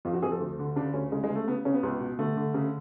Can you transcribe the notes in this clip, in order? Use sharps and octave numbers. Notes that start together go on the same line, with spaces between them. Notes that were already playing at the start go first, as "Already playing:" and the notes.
F2 F4
F#4
F2 G#4
A4
D2
D3
C#3 D4
D2 C#4
C#3 G#3
G#3
C#3
A3
C#3 B3
C#3 C#4
B3
C#2
B2
D3 A3
D3
C#3